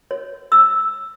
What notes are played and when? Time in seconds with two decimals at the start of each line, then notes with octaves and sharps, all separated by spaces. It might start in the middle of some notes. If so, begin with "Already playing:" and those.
0.11 C#5
0.52 E6